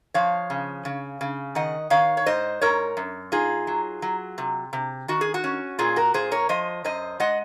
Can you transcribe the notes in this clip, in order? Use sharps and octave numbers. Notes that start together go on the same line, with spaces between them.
F3 C#5 F5
C#3
C#3
C#3
D#3 D#5 F#5
D#3 C#5 F5
C#5
G#2 C5 D#5
G#2 A#4 C#5
F#2
D#4 F4 G#4
F#3
F#3
C3
C3
D#3 F#4
G#4
F#4
C#4
A#2 F4 G#4
F#4 A#4
A#2 G#4 C5
A#4 C#5
F3 C5 D#5
F#2 C5 D#5
G#3 D#5 F#5